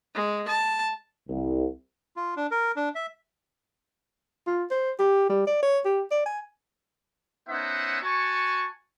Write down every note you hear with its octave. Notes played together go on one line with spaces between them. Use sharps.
G#3
A5
C2
F4
D4
A#4
D4
E5
F4
C5
G4
G3
D5
C#5
G4
D5
G#5
B3 C#4 D#4 C5 E5 F#5
F#4 G#5 A5 C#6